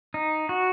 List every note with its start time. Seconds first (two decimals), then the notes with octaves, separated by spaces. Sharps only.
0.14 D#4
0.49 F#4